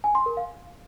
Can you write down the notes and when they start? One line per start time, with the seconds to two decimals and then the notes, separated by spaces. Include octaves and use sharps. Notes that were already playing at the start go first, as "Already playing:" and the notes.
0.04 G#5
0.15 C6
0.26 A#4
0.37 F5